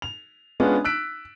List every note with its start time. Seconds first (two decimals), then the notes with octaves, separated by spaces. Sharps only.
0.02 F7
0.60 G#3 B3 C#4 D4 F4
0.85 E6 F#6 B6 D7